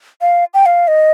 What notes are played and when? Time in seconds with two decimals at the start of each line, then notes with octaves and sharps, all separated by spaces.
0.21 F5
0.54 G5
0.66 F5
0.88 D#5